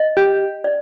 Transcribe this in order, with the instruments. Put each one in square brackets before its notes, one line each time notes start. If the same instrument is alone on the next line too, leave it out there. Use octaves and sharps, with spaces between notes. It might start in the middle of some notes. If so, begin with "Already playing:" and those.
Already playing: [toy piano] D#5
[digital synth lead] G4
[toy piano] D5